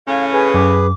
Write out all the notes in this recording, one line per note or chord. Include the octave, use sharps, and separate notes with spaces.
A2 C#3 C#4 F5
G#4 B4 G#5
F#2 D6